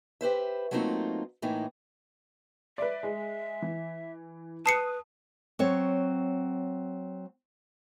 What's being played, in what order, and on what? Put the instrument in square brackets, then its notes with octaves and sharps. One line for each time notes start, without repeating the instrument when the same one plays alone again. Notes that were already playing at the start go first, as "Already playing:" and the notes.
[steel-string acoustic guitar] G4 B4 C5 E5
F#3 A3 A#3 C4 D#4 F4
A2 E3 A#3 D#4
[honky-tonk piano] B4 D5 [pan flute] E5
[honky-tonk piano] G#3
E3
[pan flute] B4 [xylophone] A5 C7 C#7 [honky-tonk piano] D#6
[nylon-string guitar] F#3 C4 C#5